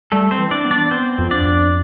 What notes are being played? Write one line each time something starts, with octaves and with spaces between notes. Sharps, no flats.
G3 A3 A4
C4 C5
E3
D4 D5
B3
D4 D5
B3 C4 C5
F2
D4 D5
F2